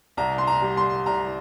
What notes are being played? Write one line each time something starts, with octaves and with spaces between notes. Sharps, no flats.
C2 A#5
C6
A#5
G3
C6
C2 A#5